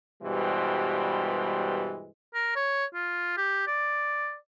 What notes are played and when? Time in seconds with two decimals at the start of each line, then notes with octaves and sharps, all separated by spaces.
0.23 G2 B2 E3 G3 G#3 C5
2.34 A#4
2.56 C#5
2.94 F4
3.37 G4
3.67 D5